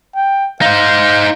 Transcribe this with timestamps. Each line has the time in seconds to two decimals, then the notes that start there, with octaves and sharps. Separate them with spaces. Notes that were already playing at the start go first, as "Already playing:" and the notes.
0.15 G5
0.61 D#4 C5 F5